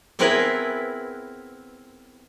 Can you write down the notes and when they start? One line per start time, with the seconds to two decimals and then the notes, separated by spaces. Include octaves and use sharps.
0.19 B3 C4 E4 G#4 A#4 B4